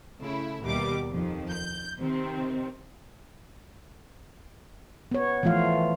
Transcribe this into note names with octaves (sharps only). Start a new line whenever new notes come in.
C#3 A3 E4
D#2 B2 G3 A#4 D6
F2 D#3 F3
G6
C3 D#3 C4
B3 C#5
E3 F3 A3 F4 F5